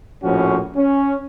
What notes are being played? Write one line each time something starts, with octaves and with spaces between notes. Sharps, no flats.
A#1 A2 F3 C#4 F#4
C#4